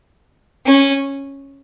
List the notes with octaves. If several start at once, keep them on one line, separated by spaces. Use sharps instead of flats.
C#4